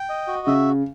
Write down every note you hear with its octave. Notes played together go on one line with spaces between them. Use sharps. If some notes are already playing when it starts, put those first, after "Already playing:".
Already playing: G5
D#5
F#4
C#3 E5